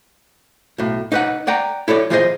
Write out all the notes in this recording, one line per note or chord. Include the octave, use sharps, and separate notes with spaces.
B1 A2
D#4 B4 F#5
D5 F#5 G5 A#5
E4 A4 C#5 D5
E3 F4 G#4 C5 D#5